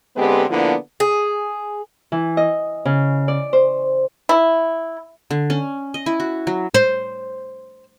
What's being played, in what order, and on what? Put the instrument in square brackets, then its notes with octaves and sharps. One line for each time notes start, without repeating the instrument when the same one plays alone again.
[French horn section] D3 G#3 B3 C4 G4 B4
D3 F3 A#3 B3 D4 E4
[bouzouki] G#4
[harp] E3
D#5
C#3
D5
C5
[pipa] E4
[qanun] D3
C#4
D#5
E4
F#4
F#3
[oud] C5